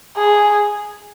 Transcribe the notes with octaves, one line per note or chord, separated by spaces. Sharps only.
G#4